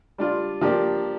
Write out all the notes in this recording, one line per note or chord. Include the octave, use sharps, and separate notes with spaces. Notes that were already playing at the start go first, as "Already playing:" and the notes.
G3 D4 F4
F3 A#3 D4 G4